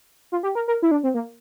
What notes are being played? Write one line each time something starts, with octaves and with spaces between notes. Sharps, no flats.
F4
G4
A#4
A#4
E4
D4
C4
A#3